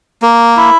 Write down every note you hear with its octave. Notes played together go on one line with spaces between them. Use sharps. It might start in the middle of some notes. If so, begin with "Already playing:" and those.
A#3
E4